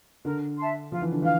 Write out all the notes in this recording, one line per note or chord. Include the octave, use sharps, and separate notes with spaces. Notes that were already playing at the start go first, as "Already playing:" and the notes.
D3 A#4
E5 A5 C6
F3 F4
E3
D3
E3 F5